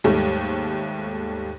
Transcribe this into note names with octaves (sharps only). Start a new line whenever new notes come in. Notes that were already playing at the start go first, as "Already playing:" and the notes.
D#2 G#2 G3 A3